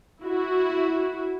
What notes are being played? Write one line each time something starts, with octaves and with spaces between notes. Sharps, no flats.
E4 F#4